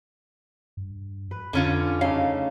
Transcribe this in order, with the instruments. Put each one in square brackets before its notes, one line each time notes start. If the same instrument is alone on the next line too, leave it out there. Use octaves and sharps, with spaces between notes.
[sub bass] G2
[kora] B4
[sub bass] F2 [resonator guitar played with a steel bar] D3 C#4 F4
[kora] C#3 A3 D#4 [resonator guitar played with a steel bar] F5